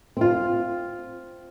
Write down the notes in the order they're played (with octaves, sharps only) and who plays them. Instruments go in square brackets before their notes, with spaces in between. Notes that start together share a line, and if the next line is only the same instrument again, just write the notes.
[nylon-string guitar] C4 F4